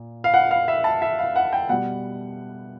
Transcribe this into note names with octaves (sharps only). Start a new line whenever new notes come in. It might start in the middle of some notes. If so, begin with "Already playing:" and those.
Already playing: A#2
F5
F#5
F5
E5
A5
E5
F5
F#5
G5
B2 G3 F#5